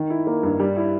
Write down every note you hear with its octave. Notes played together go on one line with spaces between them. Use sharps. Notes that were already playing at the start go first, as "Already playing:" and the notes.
Already playing: D#3
E4
A#3
G2
G3
E4